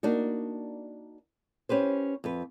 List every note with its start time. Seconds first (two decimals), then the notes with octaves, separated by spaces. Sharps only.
0.03 A#3 D4 D#4 F#4
1.69 C#4 G4 B4 C5
2.24 F2 B4